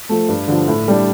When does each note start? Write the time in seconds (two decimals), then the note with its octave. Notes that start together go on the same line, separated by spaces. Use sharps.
0.09 F3 A3
0.29 G2
0.48 D3 F3
0.68 A2
0.88 G3 D4